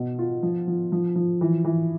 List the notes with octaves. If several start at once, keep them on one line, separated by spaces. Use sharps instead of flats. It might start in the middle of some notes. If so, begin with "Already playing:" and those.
Already playing: B2
F4
F3
F3
F3
F3
E3
E3